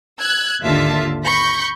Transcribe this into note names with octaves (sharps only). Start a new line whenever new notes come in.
E6 F#6 G#6
G#1 D#2 D3 F4 E5 A5
B5 C#6 G6 A#6